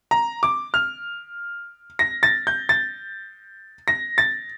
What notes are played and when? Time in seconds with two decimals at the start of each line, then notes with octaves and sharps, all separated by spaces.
0.11 A#5
0.43 D6
0.74 F6
1.99 A#6
2.23 A6
2.47 G6
2.69 A6
3.88 A#6
4.18 A6